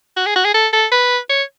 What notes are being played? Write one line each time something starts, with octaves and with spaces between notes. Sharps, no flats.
F#4
G#4
F#4
G#4
A4
A4
B4
C#5